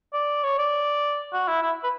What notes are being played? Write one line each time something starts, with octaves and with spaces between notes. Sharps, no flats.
D5
C#5
D5
F#4
E4
E4
B4